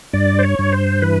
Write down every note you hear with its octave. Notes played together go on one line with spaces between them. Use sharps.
G2 D5
C5
C#5
G2
C5
E3 B4